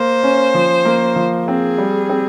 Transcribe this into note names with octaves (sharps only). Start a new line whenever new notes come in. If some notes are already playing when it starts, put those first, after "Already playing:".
Already playing: A#3 C5
C#4
F3
A#3
F3
C4 G#4
G3
C4